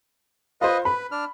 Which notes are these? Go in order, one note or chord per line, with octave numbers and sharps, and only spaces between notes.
F4 B4 C5 D#5
B4 B5
D4 F6